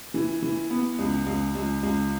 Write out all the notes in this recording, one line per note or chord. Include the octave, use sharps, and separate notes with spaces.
E3
E3
B3
C#2
C#2
C#2
C#2